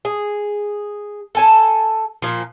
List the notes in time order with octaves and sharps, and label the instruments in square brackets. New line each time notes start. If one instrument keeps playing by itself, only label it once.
[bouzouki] G#4
A4 G#5 A5
A#2 F3